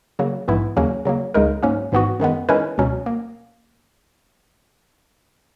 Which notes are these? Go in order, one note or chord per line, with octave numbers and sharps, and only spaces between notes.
C#3 F#3 A#3
A#1 G#2 E3 B3 E4
D#2 C#3 F#3 A#3 C#4
C#3 F#3 A#3
C#2 C#3 G#3 D#4 A#4
G#2 F#3 A#3 C#4
G#1 G#2 E3 B3 F#4
F#2 D#3 G#3 B3
D#3 G#3 C#4 E4 B4
C#2 B2 F#3 C#4
A#3